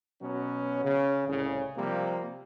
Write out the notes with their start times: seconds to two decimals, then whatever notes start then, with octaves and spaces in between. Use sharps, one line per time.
0.21 B2 F#3 B3 C#4
0.84 C#3
1.27 C2 A2 C#3
1.76 C3 F3 G3 A#3